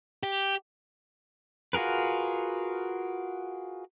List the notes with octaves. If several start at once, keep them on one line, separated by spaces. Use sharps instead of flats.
G4
F4 F#4 G#4 A#4 B4